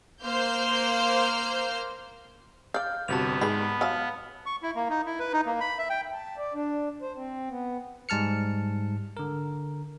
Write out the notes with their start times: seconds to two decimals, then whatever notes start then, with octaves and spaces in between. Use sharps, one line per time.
0.24 A#3 C5 F6 G6
2.74 D5 F5 F6 G6
3.08 G1 C3 B3 F#4 A5 F7
3.41 G#2 G3 G#3 B4 B5
3.81 F#3 F5 A5 F6
4.46 C#6
4.63 E4
4.75 A#3
4.90 D#4
5.06 E4
5.20 B4
5.33 D#4
5.46 A#3
5.61 B5
5.78 E5
5.90 G5
6.12 A5
6.38 D5
6.54 D4
7.02 C5
7.16 C4
7.49 B3
8.09 G#2 G3 A5 F6 C#7
9.17 D3 A#4